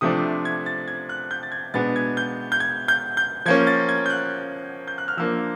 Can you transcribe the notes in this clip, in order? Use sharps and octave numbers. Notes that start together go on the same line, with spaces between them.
C3 F3 A3 D4 D#6
G#6
A6
G#6
F#6
G6
A6
G#6
B2 G#3 B3 D4 A6
G#6
G6
G6
G#6
G6
G6
F3 A#3 C#4 G#6
A6
G#6
G6
F#6
G6
F#6
F6
F3 A#3 D4 E6